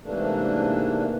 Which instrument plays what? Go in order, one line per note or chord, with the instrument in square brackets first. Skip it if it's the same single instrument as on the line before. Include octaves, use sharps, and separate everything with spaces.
[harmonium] G#2 C3 E3 A3 A#3 D4